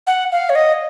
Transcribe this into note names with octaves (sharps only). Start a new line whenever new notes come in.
F#5
F5
C#5
D#5